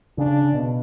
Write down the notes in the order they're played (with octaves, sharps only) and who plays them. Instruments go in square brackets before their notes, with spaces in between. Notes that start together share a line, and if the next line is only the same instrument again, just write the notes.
[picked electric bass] C#3 [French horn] D4
[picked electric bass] C#3
B2